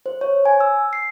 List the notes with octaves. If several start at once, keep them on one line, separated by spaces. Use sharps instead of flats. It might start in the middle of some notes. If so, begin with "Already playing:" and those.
C5
C#5
G#5
E6
C7